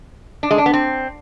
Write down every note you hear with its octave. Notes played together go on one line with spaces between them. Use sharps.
D4
G#3
D4
B3
C4